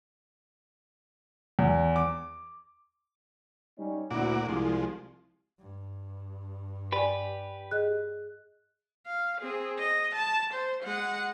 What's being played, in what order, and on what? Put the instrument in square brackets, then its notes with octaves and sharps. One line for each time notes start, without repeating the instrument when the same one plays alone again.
[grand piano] E2
D6
[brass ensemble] G3 C#4 D#4
[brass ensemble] D2 E4 [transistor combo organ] A#2 F#4 D6
[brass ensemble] C2 [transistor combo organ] F3 G#3
[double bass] G2
[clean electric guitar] G4 B4 [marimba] D5 G#5
[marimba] G#4 D#5 [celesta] F#6
[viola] F5
C4 G#4
D#5
A5
C5
G#3 F#5